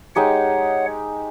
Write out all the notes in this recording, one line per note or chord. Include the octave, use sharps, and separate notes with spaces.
G#3 D#4 G4 C#5 F#5